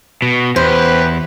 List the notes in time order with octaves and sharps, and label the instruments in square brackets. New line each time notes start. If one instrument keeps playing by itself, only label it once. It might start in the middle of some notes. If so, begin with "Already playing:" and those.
[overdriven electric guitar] B2
[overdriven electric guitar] E2 [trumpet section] C#4 G4 B4 [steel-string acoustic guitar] C5